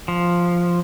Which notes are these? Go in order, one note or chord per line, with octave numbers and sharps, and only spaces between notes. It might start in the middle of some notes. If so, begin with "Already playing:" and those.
F3